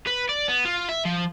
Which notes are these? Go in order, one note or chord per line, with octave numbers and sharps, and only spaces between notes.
B4
D5
B3
F4
E5
F3